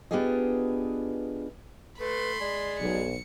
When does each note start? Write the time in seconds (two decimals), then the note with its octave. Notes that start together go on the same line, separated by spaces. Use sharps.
0.11 B3 D4 F4 G4 G#4 D#5
2.00 A3 B4 B5 C6
2.40 G#3 D5
2.79 B1 C#7